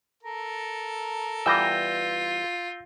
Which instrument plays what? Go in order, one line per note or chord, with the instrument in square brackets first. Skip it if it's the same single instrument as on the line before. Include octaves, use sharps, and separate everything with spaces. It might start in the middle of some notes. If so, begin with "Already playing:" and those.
[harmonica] A4 A#4
[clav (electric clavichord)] E3 G3 B3 [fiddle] F4 [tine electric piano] E6 G6 A#6